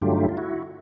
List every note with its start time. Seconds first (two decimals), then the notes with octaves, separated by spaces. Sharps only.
0.02 G2 D3 F#3 A3 F4 G4
0.12 D#4
0.21 E4
0.29 F4
0.37 E4 F#4